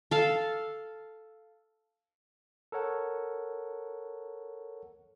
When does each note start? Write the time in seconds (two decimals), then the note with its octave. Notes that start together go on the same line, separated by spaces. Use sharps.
0.11 A4 F5
2.72 A4 A#4 C#5 F#5